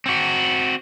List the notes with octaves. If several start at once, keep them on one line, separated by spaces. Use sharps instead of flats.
C4 F#4